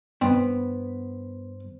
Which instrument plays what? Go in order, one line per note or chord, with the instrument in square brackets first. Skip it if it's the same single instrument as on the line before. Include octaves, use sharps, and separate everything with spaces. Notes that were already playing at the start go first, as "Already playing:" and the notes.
[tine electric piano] G2 C5 [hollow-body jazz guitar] B3 [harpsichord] C4